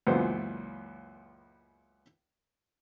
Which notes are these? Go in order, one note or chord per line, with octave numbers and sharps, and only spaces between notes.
C#2 F#2 A#2 E3 B3 C5